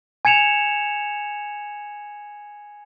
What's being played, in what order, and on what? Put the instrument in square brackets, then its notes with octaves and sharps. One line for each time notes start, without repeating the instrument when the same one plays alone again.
[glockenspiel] G#5 G#6 C#7 E7 F7